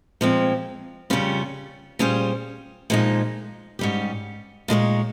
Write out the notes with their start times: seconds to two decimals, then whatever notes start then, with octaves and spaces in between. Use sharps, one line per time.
0.21 A#2 F3 G#3 C4
1.10 F2 C#3 G3 C#4 F4
1.99 A#2 G3 C#4 G#4 C5
2.90 A#2 F3 G#3 D#4
3.79 G#2 G3 C#4 G4
4.68 A#2 G#3 D#4 G#4 C#5